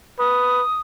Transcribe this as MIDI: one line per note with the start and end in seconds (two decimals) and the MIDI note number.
0.19 0.62 71
0.19 0.81 87